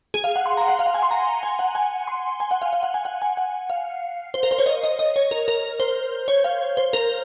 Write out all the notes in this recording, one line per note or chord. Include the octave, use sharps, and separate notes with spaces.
G#4
F5
F#5
C6
A#5
F#5
F5
F#5
G#5
C6
A#5
G#5
F#5
G#5
C6
G#5
F#5
F5
F5
F#5
G#5
F#5
G#5
F#5
F5
C5
A#4
C5
C#5
D#5
D#5
D#5
C#5
A#4
A#4
C5
C#5
F5
C5
A#4